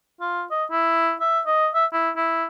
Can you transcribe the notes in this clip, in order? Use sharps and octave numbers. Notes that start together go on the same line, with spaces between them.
F4
D#5
E4
E5
D#5
E5
E4
E4